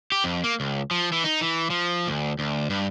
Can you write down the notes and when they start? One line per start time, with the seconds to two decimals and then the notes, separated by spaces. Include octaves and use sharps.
0.12 G4
0.24 F2
0.44 A#3
0.60 C#2
0.91 F3
1.12 E3
1.24 D#4
1.41 E3
1.70 F3
2.07 D2
2.39 D2
2.70 G2